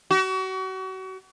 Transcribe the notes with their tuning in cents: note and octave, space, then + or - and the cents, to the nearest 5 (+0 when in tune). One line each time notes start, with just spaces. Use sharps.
F#4 +35